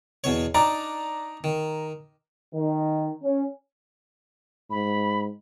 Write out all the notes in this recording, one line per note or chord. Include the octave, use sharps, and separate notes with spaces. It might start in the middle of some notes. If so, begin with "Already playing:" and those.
E2 B2 C#5
D4 D#4 D5 A#5
D#3
D#3
C#4
G#2 B5